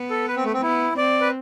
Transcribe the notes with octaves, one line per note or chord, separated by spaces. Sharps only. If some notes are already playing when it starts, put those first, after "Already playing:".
Already playing: B3
A4
B4
C4
A3
C4
B3 E4
C4 D5
B4